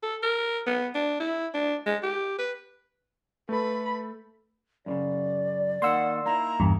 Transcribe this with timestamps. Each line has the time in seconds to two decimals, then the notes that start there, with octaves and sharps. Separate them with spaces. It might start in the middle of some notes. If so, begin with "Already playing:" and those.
0.03 A4
0.23 A#4
0.66 B3
0.95 D4
1.20 E4
1.54 D4
1.86 G#3
2.03 G4
2.38 B4
3.49 A3 A4 B4 B5
4.86 F#2 A2 C#3 D5
5.82 D#3 A#3 F#5 C6 E6
6.26 A#3 D#4 E4 A#5
6.60 E2 G2 G4